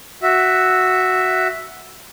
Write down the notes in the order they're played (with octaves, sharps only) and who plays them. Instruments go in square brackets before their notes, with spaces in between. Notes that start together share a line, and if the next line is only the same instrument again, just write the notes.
[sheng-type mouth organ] F#4 E5